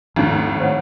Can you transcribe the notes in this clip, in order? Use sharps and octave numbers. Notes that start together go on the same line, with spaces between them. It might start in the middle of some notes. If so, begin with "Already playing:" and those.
G#1 D#2 A2 F3 C4 C#4
C5 C#5 F#5